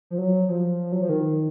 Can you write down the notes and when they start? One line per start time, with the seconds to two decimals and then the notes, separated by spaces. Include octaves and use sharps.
0.11 F3
0.18 F#3
0.49 F3
0.92 F#3
1.01 F3
1.09 D#3